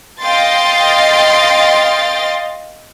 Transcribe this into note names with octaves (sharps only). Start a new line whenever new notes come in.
D#5 F5 G5 C6 A6